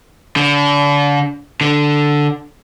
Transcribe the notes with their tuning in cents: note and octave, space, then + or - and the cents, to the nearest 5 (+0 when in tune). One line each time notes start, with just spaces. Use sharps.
D3 -35
D3 +0